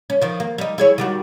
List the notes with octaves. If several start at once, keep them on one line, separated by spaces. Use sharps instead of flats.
C#4
D#3 F3
A#3
G3 D#4
E4 G#4 C#5
D#3 G3 F#4